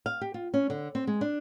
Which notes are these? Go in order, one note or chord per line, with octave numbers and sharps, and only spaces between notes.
F5
G4
F4
C#4
D3
C4
G#3
D4